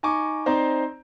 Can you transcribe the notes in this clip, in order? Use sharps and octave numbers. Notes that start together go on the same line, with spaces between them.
D#4 G#5 C#6 D6
C4 D#4 C5 D5 A#5